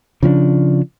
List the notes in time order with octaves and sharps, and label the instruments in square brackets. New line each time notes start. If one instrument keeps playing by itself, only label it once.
[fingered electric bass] C#3 F3 C#4 D4